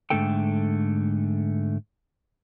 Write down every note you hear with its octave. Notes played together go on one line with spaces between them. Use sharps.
G#2 D3 A3 A4 G5